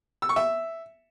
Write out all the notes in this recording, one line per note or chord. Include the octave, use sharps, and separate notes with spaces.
E6
C#6
E5